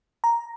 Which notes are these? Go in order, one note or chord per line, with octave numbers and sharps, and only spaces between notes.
A#5